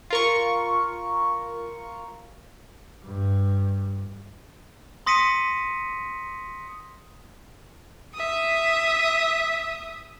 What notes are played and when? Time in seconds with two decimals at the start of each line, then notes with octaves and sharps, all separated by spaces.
0.10 F4 A#4 C#6
3.04 G2
5.06 C6 D#6 A#6 B6 C#7 D#7
8.14 E5 D#6